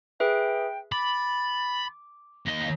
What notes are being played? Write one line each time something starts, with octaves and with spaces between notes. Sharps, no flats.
G#4 B4 E5 G5
B5 D6 A6
D#2 D#5 A#6